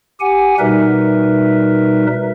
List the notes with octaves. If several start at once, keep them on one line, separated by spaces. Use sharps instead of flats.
G4 F#5 G#5
B2 G3 D#4 A#4 B4 E5